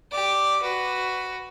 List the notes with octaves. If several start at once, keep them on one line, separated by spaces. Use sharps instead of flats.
G4 D5
F#4 B4